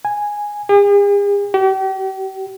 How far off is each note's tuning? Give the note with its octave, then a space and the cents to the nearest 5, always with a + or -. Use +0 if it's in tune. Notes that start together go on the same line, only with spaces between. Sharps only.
G#5 -5
G#4 -45
G4 -40